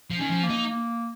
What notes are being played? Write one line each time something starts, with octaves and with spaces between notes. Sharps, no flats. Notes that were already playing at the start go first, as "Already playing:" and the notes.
F3
D#3 C#4
F3
A#3
D#4
A#3